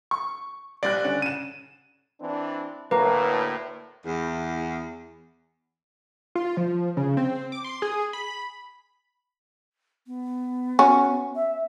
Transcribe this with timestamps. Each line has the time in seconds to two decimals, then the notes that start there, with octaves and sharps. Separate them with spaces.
0.11 C#6
0.83 A#1 G3 D5 F#6
1.04 D3 C#4
1.22 C#3 D#7 E7
2.21 E3 C4 D4
2.91 D2 A2 A#3 A#4 B4
4.06 E2
6.35 F4
6.57 F3
6.97 C#3
7.17 C4
7.52 D6
7.64 C6
7.82 G#4
8.13 B5
10.07 B3
10.79 C#4 F#4
11.35 E5